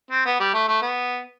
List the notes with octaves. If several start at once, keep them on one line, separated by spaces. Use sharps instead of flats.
C4
B3
G3
A3
A3
B3